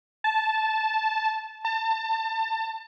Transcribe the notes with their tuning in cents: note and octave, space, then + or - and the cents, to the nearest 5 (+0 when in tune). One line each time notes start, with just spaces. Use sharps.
A5 -10
A5 +30